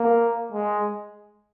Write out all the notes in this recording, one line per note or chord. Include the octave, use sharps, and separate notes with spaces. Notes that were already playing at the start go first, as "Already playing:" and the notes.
Already playing: A#3
G#3